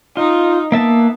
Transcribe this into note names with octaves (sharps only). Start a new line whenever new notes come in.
D#4 F4
A#3 B3 E5 A5